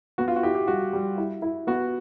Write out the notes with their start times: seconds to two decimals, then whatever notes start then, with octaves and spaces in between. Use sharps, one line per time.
0.18 B3 F#4
0.28 F4
0.36 F#4
0.43 E4 G4
0.55 G4
0.67 G3 F#4
0.93 G3
1.17 E4
1.42 E4
1.67 B3 F#4